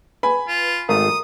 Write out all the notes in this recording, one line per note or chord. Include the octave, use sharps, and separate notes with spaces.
B4 G#5 B5
F4
G#1 A3 A#4 F5 D#6